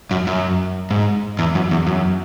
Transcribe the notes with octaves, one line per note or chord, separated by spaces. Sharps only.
F#2
F#2
G#2
E2
F#2
E2
F#2